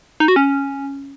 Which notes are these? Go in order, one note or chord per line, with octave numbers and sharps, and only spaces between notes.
D#4
F#4
C#4